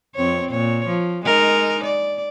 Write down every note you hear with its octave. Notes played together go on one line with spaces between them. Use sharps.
F2 C4 C#5
A#2 C#5
F3
G#3 D#4 A#4
D5